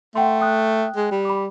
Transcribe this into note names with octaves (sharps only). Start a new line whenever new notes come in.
A3 F#5 G5 C6
G5 D#6 F#6
G#3
G3
B5 D6